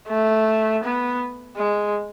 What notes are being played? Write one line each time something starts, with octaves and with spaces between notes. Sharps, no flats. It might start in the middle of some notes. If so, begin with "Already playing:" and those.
A3
B3
G#3